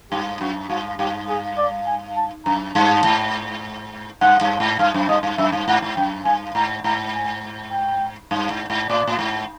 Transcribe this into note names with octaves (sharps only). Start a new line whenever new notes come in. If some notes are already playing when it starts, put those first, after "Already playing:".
G2 G4
F#2 F#4
G2 F#4
G2 G4
G#4
D5
G#5
A5
F#2 A#5
G2 A5
G#2
G2 F#5
G2
G#2
G2 F5
F#2
G2 D#5
G2
F#2 E5
G2
G#2 F#5
G#2
F#2 G5
G2 G#5
G#2 A#5
G#2 A#5
G#5
G5
G2
G#2
G#2
A2 D5
A2
G#2